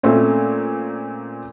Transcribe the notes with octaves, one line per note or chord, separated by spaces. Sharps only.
A#2 A3 C4 C#4